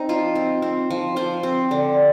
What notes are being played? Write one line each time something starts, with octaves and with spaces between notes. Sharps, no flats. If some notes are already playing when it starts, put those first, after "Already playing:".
Already playing: C4 D#4
F3 F4
C4
C4
F3
F3 C5
C4
D3